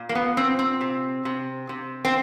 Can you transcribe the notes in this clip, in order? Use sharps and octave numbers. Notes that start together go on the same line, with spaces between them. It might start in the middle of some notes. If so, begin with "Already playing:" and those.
Already playing: A#2
A#3
B3
A#2 C4
C4
C3
C3
C3
C4